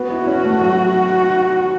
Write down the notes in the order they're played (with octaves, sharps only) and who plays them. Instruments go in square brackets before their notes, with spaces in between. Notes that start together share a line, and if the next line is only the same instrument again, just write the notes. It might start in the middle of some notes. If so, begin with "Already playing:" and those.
Already playing: [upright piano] B3 [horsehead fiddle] F#4
[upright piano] E4
C#4
A3
F#3